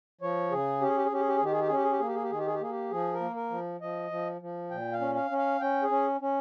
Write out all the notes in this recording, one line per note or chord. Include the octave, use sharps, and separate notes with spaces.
F3 C#5
C#3 G#4
C#4 G4
G#4
G4
G#4
C#4 G4
G#4
G4
G#4
D#3 G4
G#4
G4
G#4
C#4
G4
G#4
G4
A#3 G#4
G4
G#4
G4
D#3 G#4
G4
G#4
G4
A#3 G#4
G4
F3 G#4
A#4
A#3
A#4
F3
F3 D#5
F3
F3
A#2 G5
F5
C#4
F5
C#4
F5
C#4 G5
G#4
C#4
C#4